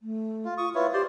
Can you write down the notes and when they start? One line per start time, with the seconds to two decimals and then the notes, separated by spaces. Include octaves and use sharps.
0.01 A3
0.45 F4
0.58 F4 C#6 D#6
0.75 E4 F4 B4 C#5
0.93 G4 C5 D5 C6